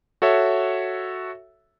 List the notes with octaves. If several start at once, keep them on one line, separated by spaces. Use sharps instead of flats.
F#4 A4 C#5 E5